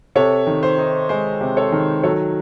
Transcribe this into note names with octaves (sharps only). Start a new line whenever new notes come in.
C3 A4 C#5
D#3
C5
D#4
G#3 C5
C3
A4 C#5
D#3
F#3 A4 C#5